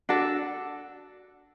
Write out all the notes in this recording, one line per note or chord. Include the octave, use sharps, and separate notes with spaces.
D4 F#4 A4